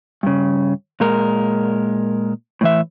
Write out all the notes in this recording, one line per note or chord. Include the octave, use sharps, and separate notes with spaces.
G2 C#3
A#2 G#3 A#4
A2 E3 E5